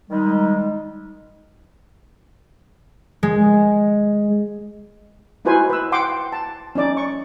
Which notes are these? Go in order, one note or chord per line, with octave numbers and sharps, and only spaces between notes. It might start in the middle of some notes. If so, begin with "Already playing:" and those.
D#3 G3 G#3 D#4
G#3
D#4 E4 F#4 B4 C5 G#5
B4 E6
F#5 G5 C6 D6
A5
C#4 D#4 D5 D6
C#6